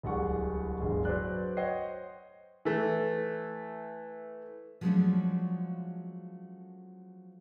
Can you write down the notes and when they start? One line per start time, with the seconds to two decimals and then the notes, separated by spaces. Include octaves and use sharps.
0.03 D1 C2 G#3 G4 F#5 C#6
0.80 D1 G1 G#3
1.05 F#3 B4 C5 D5 F#6
1.57 C5 C#5 D#5 F#5 G5 C7
2.65 E3 A3
4.81 F3 F#3 G#3 A3 C#4 D4